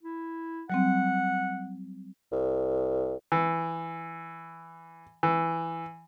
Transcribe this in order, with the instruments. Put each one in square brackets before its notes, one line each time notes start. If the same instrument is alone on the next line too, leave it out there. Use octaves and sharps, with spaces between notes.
[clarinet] E4
[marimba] F#3 G3 C4 [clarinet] F#5
[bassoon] C2
[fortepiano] E3
E3